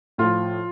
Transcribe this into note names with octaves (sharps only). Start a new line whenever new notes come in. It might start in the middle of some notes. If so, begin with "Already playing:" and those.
A2 F3 F4